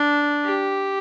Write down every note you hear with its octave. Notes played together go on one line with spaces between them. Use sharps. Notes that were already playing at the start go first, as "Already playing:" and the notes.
Already playing: D4
G4